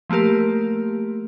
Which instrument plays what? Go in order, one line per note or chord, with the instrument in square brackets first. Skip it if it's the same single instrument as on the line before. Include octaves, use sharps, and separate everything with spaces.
[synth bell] F3 A3 A#3 G4 A#4